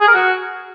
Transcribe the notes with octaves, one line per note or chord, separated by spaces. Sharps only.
G#4
A#4
F#4